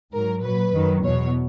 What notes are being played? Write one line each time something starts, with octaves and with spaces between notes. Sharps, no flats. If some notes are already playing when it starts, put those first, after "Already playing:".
G#2 F#3 A#4
A#2 F#3 B4
F#2 D#3 F#3
E2 B2 F#3 C#5